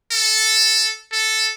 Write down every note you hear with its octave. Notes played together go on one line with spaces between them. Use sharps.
A4
A4